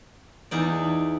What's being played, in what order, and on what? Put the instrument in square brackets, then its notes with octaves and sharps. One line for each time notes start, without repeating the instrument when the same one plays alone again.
[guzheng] E2 D#4 D5